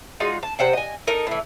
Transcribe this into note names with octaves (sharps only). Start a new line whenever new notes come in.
G#3 D#4 F4 F#4
A5
C3 C5 F#5 G5
D#5 G#5
D#4 A4 A#4 D#5
A2 E3